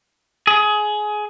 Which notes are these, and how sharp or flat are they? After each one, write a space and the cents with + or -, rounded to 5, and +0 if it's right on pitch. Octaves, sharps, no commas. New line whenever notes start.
G#4 +20